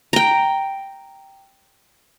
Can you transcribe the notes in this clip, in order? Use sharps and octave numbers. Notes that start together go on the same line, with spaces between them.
G5 A#5